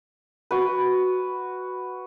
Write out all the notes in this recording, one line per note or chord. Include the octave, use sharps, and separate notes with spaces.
F#4 B4